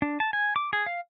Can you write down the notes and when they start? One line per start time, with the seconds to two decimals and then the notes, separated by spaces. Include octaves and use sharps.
0.02 D4
0.20 A5
0.33 G#5
0.56 D6
0.73 G#4
0.86 F5